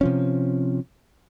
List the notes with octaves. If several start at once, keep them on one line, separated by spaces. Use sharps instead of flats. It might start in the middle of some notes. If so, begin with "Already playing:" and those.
C3 F3 C#4